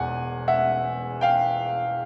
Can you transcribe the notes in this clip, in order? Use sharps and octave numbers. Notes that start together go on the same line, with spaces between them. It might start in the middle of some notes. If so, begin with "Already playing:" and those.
Already playing: E1 E2 F#5 G#5
E5 F#5
F5 G5